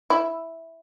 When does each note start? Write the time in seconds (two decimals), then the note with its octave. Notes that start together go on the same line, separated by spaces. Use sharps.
0.10 E4